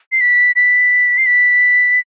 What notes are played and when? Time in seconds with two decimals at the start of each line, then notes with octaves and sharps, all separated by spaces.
0.12 C7
0.21 B6
0.56 B6
1.18 C7
1.26 B6